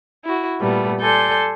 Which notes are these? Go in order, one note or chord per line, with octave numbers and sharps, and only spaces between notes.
E4 F#4
A#2 G3 A3 B3
A4 D5 G#5 C6 G6